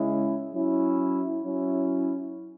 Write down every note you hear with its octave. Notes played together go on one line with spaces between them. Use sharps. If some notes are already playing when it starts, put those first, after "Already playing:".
Already playing: C#3 G#3 C#4 E4
F#3 C#4 E4
F#3 C#4 E4